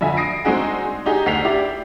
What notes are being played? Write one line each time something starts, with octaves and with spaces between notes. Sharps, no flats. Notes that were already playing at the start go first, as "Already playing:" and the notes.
F2 D3 E5 G#5
D#6 A#6 C7 D7
G#3 C4 D4 D#4 F#4 G#4
D4 D#4 G4 G#4
D2 D4 D#4 B6 C7 F7
E4 G4 D5